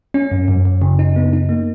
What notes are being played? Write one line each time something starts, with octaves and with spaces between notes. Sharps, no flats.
C#4
F#2
F#2
F#2
C#3
D#4
B3
D#4
A#3